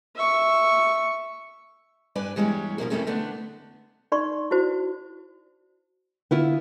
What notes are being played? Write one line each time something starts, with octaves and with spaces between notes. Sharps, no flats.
E5 C#6
G2 D4 B4 D5 G#5
E2 G3 G#3 G4 C#5
B2 D3 F3 A#3
F2 G#2 C3 A3 A#3 C#4
D3 A3 B3 D4
D#4 D5 C6 C#6
E4 F#4 C5
D3 B3 E4 F4